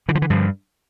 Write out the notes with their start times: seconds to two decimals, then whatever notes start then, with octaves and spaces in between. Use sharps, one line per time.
0.08 D3 E3
0.15 F3
0.22 E3
0.30 G2 F3